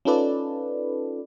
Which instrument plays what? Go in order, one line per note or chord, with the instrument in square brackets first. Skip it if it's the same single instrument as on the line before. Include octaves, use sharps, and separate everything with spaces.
[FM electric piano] C#4 D#4 F4 A4 B4 D5